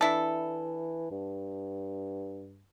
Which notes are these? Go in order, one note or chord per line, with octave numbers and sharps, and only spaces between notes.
E3 D4 E4 A4
G2